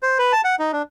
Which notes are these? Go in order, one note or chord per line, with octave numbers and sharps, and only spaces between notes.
C5
B4
A5
F#5
D#4
D4